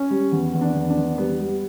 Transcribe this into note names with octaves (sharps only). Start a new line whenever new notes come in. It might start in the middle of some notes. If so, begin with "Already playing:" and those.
Already playing: C#4
G3
E2
E2
D4
E2
D4
E2
G3 B3
G3